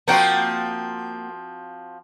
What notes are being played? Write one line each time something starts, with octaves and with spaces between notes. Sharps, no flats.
F3 A#3 C4 F#4 F#5 G5